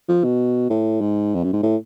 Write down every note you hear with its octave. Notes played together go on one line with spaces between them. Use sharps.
F3
B2
A2
G#2
F2
F#2
G#2
A2